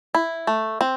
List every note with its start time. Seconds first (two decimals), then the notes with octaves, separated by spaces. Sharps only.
0.15 E4
0.47 A3
0.81 C4